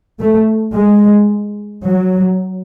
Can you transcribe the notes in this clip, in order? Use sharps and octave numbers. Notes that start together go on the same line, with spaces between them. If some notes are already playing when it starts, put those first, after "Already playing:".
A3
G#3
F#3